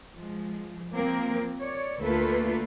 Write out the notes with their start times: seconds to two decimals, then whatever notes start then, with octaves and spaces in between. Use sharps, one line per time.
0.14 F3 G#3
0.95 F3 A#3 C4 A#4
1.60 C#5 D5
2.00 D2 A3 A#3 F4 A4 B4